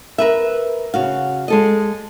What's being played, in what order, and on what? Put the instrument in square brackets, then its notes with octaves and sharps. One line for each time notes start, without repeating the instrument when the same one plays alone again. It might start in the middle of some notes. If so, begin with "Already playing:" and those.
[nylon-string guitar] A#4 B4 E5
C#3 F#4 F5
G#3 A4 D#5